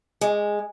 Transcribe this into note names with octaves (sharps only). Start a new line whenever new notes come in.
G#3